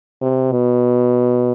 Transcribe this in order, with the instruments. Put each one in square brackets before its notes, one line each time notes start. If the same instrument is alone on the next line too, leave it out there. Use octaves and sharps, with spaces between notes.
[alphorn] C3
B2